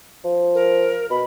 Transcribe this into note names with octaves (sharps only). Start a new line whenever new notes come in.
F3
A#4
B2 B5